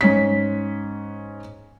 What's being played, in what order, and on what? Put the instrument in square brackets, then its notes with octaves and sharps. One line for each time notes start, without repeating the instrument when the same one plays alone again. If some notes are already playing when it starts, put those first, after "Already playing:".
[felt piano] G#2 C#4 B6